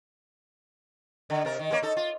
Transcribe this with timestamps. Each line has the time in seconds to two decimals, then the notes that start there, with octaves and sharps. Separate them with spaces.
1.30 D3
1.45 C3 A#4
1.59 D#3
1.71 G#3 A#3 C#5
1.82 D#4 A4
1.97 F4